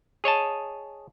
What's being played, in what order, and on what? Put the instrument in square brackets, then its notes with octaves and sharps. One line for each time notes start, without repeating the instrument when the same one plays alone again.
[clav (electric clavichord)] G#4 C#5 D#5 A5